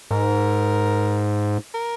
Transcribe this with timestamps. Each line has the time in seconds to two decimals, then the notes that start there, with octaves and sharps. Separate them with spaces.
0.11 G#2 A#4
1.74 A#4